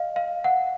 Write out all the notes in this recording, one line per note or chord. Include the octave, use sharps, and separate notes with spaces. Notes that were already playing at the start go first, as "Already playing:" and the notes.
Already playing: D#5 F5
F5
F#5